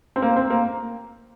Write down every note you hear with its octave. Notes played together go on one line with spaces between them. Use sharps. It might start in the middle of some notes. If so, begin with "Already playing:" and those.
C4
A#3
C4
A#3